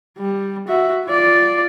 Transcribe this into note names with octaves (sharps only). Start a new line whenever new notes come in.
G3
F#4 E5
F4 D5